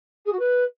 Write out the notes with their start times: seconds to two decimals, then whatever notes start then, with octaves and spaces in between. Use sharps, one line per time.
0.25 G#4
0.32 F#4
0.39 B4